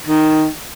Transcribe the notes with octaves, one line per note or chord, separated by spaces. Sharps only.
D#3